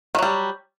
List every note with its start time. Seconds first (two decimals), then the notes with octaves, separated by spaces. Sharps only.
0.15 D#3
0.19 F#3
0.22 G3